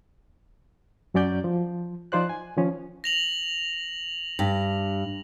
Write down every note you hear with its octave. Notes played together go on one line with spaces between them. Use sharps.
F#2 F#3 C#4 D5 G6
F3
F3 D#4 F4 C5 D5 F#6
G#5
D#3 F3 C#4
A#6 F7 F#7
G2